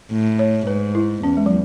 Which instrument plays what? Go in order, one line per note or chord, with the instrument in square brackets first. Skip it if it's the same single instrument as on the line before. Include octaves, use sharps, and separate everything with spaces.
[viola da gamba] A2
[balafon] C#5
[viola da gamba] G#2 [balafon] B4
[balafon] E4
[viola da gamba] E2 [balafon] C#4
[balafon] G#3
F#3